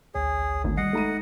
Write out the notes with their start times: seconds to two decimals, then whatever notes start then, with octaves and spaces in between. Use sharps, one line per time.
0.15 A1 D2 G#4 C#5
0.64 G#1 D2
0.77 G3 D#5 F#5 C7
0.93 G#3 A3 D#4 A#5 D#7